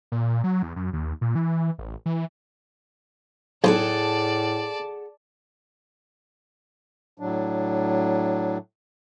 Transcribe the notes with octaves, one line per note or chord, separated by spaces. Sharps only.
A#2
F#3
E2
F#2
D#2
A#2
E3
A1
E3
B1 A2 G#4 A4 C5 D5 F#5 A5
A2 F#3 D4